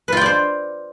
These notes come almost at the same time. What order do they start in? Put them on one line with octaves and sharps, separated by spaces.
B4 F4 G5 D5 C5